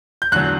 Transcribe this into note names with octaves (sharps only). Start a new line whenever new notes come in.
G6
E2 D3 F#3 F#6